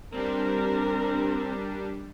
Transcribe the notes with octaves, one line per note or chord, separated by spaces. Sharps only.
G3 C4 D4 A#4